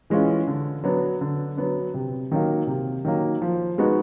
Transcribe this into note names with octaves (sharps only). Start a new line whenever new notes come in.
E3 G#3 C#4 F4
D3
F#3 B3 D4
D3
F#3 B3 D4
C3
D#3 F#3 A#3
C3
D#3 F#3 A#3
F3
G#3 B3 D#4 F#4